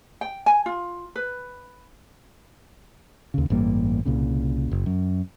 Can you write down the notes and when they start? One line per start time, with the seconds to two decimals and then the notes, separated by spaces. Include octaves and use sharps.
0.21 G5
0.46 G#5
0.66 F4
1.15 B4
3.34 D#2 C#3
3.50 A1 G2 G3 A#3
4.05 C2 A#2 C#3
4.71 F#1
4.86 F#2